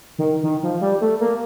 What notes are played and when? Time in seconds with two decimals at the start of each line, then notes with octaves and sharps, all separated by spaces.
0.19 D#3
0.43 D#3
0.63 F3
0.81 G3
1.01 A3
1.20 A#3